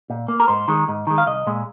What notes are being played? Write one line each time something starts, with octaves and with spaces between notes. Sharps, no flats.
A#2
A#3
A#4
G#2 C5
D#3 G#3
G#2
D#3 G#3
F5
C2 D#5
A#2 G#3